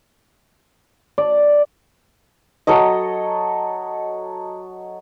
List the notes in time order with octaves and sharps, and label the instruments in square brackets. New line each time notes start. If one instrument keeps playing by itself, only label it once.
[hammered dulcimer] D5
[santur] F#3 A4 C#5 D#5